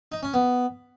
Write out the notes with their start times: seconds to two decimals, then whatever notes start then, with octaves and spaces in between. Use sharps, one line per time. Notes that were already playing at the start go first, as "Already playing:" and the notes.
0.12 D#4
0.23 C#4
0.34 B3